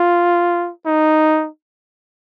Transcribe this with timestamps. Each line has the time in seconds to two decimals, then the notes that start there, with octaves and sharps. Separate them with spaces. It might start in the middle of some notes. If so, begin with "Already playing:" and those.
Already playing: F4
0.85 D#4